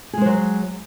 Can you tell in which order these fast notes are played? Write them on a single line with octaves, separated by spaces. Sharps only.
G#4 G#3 C5 F#3